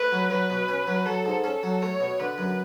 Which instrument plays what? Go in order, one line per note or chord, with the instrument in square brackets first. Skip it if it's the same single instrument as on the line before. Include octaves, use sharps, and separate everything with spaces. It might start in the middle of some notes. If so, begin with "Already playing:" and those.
Already playing: [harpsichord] A3 [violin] B4
[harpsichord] F#3
[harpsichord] F#3 [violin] B4
[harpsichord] B2
C#4
F#3
[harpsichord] F#3 [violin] A4
[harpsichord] G#2
[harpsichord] C#4 [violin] A4
[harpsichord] F#3
[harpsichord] A3 [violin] C#5
[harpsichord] B2
[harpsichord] D3 [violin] B4
[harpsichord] F#2